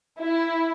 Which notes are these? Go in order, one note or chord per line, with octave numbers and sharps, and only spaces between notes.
E4